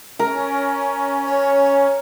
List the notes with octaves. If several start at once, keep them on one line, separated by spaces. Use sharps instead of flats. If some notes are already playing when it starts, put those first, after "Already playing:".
C#4 A#4
C#5